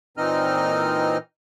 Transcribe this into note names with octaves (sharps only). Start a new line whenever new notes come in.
A#2 E3 C4 D#4 D#5 F6